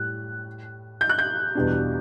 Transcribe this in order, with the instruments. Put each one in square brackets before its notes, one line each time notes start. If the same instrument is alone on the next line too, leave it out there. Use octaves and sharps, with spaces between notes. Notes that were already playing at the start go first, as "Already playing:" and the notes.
Already playing: [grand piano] A2 G3 [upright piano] F#6
[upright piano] G6
F#6
G6
[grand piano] E2 B2 G3 D4